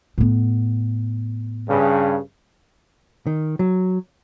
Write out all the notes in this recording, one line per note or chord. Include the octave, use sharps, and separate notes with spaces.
A2 B3
G2 C#3
D#3
F#3